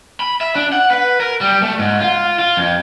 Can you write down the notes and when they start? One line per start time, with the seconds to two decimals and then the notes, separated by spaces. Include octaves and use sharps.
0.20 B5
0.41 E5
0.55 D4
0.73 F#5
0.91 B4
1.20 A#4
1.41 G3
1.62 A3
1.79 G#2
2.00 F4
2.39 F4
2.57 F2